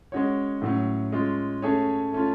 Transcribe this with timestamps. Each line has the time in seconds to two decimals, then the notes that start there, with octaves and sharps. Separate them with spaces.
0.12 G#3 C#4 F#4 C#5
0.62 A2 F#3 C#4
1.12 G#3 C#4 F4
1.62 A3 C#4 G#4 C#5
2.13 A3 C#4 F4